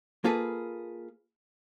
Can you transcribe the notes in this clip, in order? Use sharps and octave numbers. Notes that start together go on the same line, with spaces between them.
A#3 F4 G#4 A4 B4